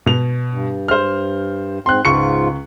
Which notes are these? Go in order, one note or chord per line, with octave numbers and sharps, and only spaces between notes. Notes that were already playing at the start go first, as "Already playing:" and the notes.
B2 F7
G2
C5 F6
G#2 C4 C6 F#6
C#2 G#2 F4 C#6 C#7